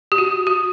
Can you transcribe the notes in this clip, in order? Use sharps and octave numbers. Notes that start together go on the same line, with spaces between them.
G4
F#4
F#4